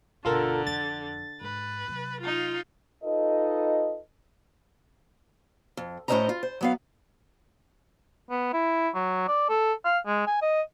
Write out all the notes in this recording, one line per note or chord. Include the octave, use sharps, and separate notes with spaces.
G1 B2 D3 F4 A4 A#4
F2 A6
G#2 B4
C3 F#3
D#4 F4
D#4 F4 A4 B4 D#5
F2
A2 C#4 A#4 C5 D#5 A#5
F4
C5
F#3 B3 F5
B3
E4
F#3
D5
A4
F5
G#3
G#5
D#5